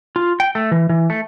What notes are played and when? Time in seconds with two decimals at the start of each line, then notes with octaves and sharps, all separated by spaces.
0.16 F4
0.40 G5
0.55 A3
0.72 E3
0.89 E3
1.10 A3